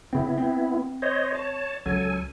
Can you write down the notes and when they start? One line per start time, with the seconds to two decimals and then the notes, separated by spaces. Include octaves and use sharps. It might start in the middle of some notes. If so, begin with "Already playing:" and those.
0.13 C#3 B3 C4 E4
0.38 C4
1.02 C5 C#5 D#5
1.35 C#5 A5
1.86 C#2 F#3 A4 G#5